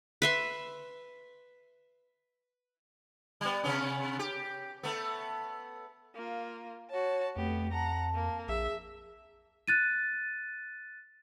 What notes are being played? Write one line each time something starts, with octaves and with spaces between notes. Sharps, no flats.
B4 E5 C6
G3 B3
C3 B3 C#4
G4
A3 B3
A#3 F4
F#4 C#5 A5
F2 A3 B3 G4
F#5 A5 A#5
A#3
A#1 G#4 E5
F#6 A6 D#7